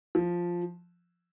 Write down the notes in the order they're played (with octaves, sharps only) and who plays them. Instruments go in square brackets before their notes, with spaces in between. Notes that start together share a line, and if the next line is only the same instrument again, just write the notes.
[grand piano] F3